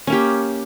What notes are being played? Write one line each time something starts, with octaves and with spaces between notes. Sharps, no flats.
A#3 C#4 G4